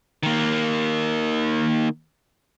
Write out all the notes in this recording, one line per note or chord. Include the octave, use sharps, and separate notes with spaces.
D#3 A#3